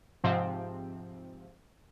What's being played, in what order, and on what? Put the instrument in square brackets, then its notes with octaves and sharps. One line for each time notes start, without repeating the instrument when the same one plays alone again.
[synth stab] G#2 C3 F3 C4